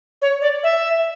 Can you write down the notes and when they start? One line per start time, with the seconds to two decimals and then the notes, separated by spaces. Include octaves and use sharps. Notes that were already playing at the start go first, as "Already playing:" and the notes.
0.22 C#5
0.42 D5
0.63 E5